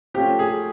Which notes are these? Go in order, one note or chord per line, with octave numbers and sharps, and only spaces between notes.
F3 A3 C#4 G4
G#4